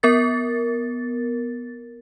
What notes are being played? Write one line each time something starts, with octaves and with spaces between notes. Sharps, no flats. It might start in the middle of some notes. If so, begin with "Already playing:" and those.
B3 A#4 A6